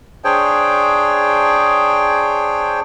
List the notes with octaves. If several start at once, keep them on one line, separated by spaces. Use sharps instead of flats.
D4 G#4 C5 C#5 G5